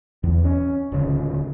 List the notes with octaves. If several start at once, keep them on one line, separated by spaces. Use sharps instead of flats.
E2
C#4
D1 C#3